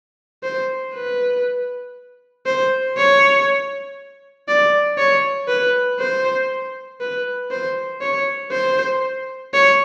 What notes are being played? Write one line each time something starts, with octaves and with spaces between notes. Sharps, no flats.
C5
B4
C5
C#5
D5
C#5
B4
C5
B4
C5
C#5
C5
C#5